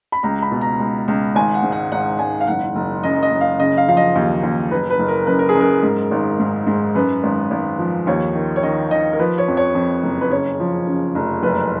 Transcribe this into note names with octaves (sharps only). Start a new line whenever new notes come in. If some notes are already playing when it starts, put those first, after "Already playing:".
B5
C#2 A#5
B5
B2
A#5
C#2
C#2
G#1 G#5
F#5
G#2
F#5
G#1 F#5
G#1 G#5
F5
F#1 F#5
F#1
F#2 D#5
D#5
F#1
F5
C#3 D#5
F5
F3 F5
D#5
D#2
D#2
F#1 B4
B4
F#1
A#4
F#2 B4
A#4
G#4
F#2 A#4
G#2
G#1
G#2
G#2
F#2 B4
G#1
G#1
F3
D#2 C#5
D#3
C#5
D#3 D#5
D#3 D#5
A#4
F3 B4
C#5
F2
C#5
F2
F#1
B4
C#3 C#5
F3
C#3
F1
F#1 B4